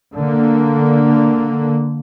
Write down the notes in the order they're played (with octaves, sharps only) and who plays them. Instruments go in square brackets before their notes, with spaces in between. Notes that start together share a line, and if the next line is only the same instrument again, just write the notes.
[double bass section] D3 A#3